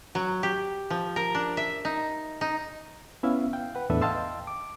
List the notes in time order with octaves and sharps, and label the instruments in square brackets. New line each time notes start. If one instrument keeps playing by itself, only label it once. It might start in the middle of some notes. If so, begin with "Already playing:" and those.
[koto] F#3
G4
F3
A#4
D4
E5
D#4
D#4
[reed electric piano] B3 C#4 E4 E5 F5
F5 G5
B4 F#5
E2 A2 D4 A4 B4 E5
D#5 F5 G5 A5 C6 E6
D6